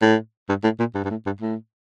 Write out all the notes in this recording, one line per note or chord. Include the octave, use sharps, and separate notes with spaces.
A2
G2
A2
A#2
G2
G2
A2
G2
A2